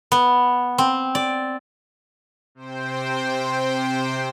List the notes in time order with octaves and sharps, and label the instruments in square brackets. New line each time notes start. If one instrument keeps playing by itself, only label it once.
[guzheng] B3
C4
D5
[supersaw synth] C3 C5 G5